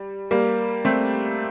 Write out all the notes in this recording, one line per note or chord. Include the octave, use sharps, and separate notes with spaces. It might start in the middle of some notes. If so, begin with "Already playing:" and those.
Already playing: G3
G3 A#3
A3 C4